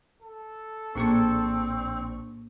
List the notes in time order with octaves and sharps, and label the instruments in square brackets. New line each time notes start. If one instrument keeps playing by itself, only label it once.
[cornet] A4
[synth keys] A#1 D4 C#6 [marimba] A2 A#3 G#4 [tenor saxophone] C4